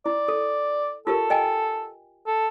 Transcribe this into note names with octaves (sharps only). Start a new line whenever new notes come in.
E4 D5
A4
F4 G4 A4 A#4
D#5 G5 G#5
A4